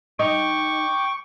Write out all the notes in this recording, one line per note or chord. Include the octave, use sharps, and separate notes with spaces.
D#4 G5 C#6 D6